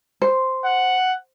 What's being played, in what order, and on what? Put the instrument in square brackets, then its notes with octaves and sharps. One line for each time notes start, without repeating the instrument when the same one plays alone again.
[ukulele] C5
[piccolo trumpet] F#5